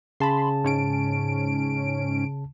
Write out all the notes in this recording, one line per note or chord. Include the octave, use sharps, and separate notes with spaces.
C#3 A5 B5 C6
G#2 C#4 D7